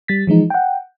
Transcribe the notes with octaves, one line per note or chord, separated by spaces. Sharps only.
G3 A6 B6
E3 F3 G#3 D#4
F#5 G5